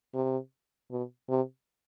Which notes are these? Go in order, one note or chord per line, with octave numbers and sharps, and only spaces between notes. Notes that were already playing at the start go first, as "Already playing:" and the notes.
C3
B2
C3